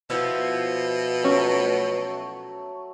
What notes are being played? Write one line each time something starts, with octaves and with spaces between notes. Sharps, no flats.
B2 F3 B3 E4
F#3 A3 C#4 C#5